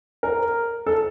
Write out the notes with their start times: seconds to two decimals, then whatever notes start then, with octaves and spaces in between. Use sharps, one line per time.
0.23 A#4
0.87 A4